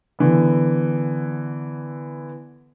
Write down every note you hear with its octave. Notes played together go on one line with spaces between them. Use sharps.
D3 E3 B3